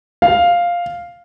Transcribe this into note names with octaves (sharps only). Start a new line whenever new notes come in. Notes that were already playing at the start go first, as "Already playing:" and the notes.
F5